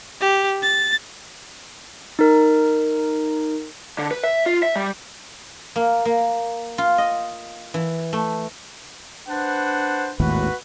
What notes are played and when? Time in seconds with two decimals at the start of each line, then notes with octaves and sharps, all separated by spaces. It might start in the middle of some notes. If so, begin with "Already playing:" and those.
0.21 G4
0.62 A6
2.19 D#4 A#4
3.99 D3
4.11 B4
4.24 E5
4.46 F4
4.63 E5
4.76 G3
5.76 A#3
6.05 A#3
6.78 F4
6.98 D#5
7.74 E3
8.13 A3
9.28 D4 B4 C5 F#5
10.20 G#1 D#2 A2 F#4 B4